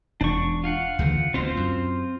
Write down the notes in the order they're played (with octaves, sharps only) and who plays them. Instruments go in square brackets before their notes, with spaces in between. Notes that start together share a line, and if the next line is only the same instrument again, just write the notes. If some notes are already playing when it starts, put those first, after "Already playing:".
[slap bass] E1 [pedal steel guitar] D4 C#6
[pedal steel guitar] F4 F5 F#5
[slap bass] D2 C#3 E3
[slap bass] D2 B2 [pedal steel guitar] C4 F4 C5
[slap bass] F#2